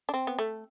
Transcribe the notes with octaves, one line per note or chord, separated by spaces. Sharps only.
D4
C4
B3
A3